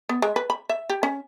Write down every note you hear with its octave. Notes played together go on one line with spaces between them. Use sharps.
B3
G#3
B4
B5
E5
G4
C#4